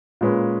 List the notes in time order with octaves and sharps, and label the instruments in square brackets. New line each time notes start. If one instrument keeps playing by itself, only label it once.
[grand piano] A#2 G#3 C#4 F4 B4